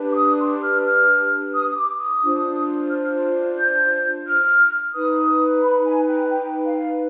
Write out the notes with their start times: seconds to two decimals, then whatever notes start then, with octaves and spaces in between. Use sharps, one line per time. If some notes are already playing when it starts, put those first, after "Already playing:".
Already playing: D4 G4 B4
0.12 D6
0.17 D#6
0.39 C6
0.62 F6
0.85 F6
1.54 D#6
1.70 D#6
1.76 D6
1.99 D#6
2.22 D4 F4 C5
2.90 F6
3.59 G6
4.27 F6
4.94 D#4 B4 D#6
5.62 B5
5.86 G#5
6.08 G5
6.31 G5
6.65 F5